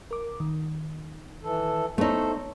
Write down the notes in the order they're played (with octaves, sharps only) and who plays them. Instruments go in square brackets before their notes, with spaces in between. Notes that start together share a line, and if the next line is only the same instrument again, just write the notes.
[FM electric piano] A#4 D6
D#3
[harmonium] E3 A4
[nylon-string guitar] A3 D#4 [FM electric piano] B3 E4 C#5 [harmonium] A4 C5